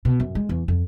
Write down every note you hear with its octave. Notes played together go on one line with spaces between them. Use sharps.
B2
F#2
G#3
E2
F2